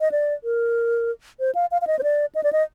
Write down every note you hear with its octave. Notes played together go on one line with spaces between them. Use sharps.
D#5
D5
A#4
C5
F5
F5
F5
D#5
C5
D5
D#5
D5
D#5